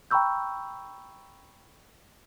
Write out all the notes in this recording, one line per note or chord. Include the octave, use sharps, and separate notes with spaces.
G5 A#5 B5 C#6 E6 G6